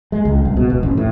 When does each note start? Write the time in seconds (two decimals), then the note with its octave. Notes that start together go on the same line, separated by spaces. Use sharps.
0.12 G#3
0.25 C#2
0.45 C2
0.57 B2
0.70 E1
0.83 A1
0.97 A2